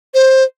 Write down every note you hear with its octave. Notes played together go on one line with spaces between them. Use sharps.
C5